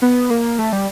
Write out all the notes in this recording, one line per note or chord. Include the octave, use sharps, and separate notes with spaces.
B3
A#3
A3
G3